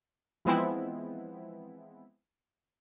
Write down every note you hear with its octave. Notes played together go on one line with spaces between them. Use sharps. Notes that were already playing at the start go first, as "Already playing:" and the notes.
E3 F3 G#3 B3 C4 E4